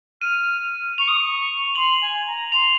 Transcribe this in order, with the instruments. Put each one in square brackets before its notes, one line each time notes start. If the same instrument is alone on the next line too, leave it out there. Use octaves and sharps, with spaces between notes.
[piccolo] F6 [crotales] D#7
[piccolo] C#6 [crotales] F7
[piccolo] D#6
C#6
[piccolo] C6 [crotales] F#7
[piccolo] G#5
A#5
[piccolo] C6 [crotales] F7